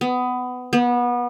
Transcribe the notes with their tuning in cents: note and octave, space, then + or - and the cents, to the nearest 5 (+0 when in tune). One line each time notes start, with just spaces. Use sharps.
B3 +20
B3 -25